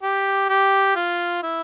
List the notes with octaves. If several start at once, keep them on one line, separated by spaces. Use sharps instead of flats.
G4
G4
F4
E4